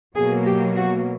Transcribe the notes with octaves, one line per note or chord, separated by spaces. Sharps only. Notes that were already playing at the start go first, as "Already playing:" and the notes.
B2 F#3 A#3 G#4
G4
F#4